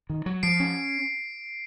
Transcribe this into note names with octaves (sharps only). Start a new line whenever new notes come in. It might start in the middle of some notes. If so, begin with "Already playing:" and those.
D#3
F#3
F3 C7 D7
C#4